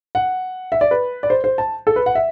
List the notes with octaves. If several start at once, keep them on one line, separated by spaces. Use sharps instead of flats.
F#5
E5
D5
B4
D5
C5
C5
A5
A4
B4
F#5
E5